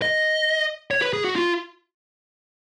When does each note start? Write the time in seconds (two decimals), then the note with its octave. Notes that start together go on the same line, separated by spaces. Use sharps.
0.02 D#5
0.91 C#5
1.02 B4
1.13 G#4
1.25 F#4
1.36 F4